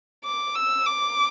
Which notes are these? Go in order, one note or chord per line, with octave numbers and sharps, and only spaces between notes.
D6
E6
D6